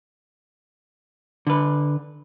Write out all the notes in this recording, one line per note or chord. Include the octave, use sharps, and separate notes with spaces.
D3 B4